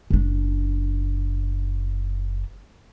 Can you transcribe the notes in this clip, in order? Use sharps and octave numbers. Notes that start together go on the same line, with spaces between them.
F#1 D4